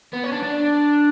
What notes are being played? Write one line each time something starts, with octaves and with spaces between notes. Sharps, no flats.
B3
C#4
D4
D4